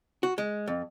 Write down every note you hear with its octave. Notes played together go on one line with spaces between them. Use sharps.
F#4
G#3
F2